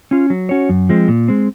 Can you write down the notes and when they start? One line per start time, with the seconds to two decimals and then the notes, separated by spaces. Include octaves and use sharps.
0.11 C#4 F4
0.30 F#3
0.49 C#4 F#4 C#5
0.69 F#2
0.89 F3 G#3 C4
1.08 A#2
1.28 G#3 C4